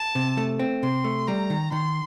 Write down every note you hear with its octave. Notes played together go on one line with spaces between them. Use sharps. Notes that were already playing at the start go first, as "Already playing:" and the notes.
Already playing: A5
C3
A3
C4
C3 C6
A3
G3 A#5
D#3
D#3 C6